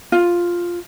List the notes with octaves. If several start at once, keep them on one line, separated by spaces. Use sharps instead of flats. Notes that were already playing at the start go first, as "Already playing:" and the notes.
F4